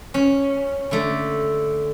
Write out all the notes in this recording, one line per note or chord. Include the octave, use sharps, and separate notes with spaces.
C#4
D3 A3